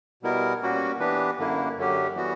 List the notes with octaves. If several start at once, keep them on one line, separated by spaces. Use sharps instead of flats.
B2 G3 B3 E4 A#4
A#2 G3 A#3 C#4 F#4
E3 B3 D4 G4 B4
F#2 D3 A#3 E4
F#2 D3 F#3 C#4 G4
E3 G3 B3 F#4